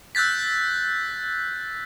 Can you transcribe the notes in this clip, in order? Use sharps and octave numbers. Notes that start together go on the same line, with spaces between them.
E6 F#6 G6 A6 B6